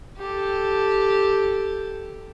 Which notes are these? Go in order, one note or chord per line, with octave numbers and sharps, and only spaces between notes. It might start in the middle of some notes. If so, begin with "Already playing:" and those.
G4 A4